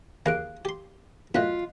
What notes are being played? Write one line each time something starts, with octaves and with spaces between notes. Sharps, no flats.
D#2 C#3 A#3 F5 F#6 D7
G4 C6
F#2 A2 F4 D#5 F#6 B6